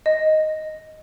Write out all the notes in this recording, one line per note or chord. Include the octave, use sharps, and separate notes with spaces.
D#5